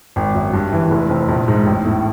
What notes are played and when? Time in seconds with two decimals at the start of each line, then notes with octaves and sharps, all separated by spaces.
0.16 G#1
0.35 F#2
0.53 G2
0.73 E3
0.91 F1
1.09 F2
1.29 A#1
1.48 G#2
1.66 A1
1.85 A2